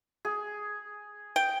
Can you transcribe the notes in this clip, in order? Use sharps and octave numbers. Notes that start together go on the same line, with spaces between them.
G#4
G5